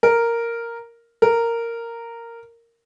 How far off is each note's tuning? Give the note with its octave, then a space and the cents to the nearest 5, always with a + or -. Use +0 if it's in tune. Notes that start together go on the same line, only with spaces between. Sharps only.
A#4 -5
A#4 -10